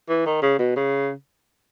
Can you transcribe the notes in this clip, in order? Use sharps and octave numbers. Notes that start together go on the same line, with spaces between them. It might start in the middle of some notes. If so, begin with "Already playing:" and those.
E3
D#3
C#3
B2
C#3